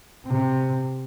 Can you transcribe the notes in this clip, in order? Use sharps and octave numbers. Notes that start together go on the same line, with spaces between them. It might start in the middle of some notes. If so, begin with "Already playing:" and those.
C3